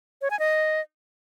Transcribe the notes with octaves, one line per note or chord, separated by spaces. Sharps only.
C#5
G#5
D#5